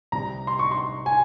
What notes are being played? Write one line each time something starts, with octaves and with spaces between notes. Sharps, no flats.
C2 C3 G3 A#5
C6
C#6
C6
G#5